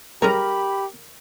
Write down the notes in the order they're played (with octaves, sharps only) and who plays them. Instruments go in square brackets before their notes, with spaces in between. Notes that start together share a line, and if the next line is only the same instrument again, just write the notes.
[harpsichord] G3 G#3 C#4 [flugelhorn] G4 [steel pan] A#4 A#5 [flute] B5